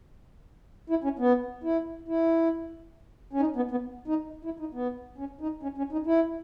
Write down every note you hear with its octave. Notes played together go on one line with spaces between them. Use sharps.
E4
C#4
B3
E4
E4
C#4
D#4
B3
B3
D#4
E4
D#4
B3
C#4
D#4
C#4
C#4
D#4
E4